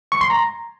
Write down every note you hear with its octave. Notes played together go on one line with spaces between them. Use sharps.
C#6
C6
A#5